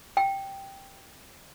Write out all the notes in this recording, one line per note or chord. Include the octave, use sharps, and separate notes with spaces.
G5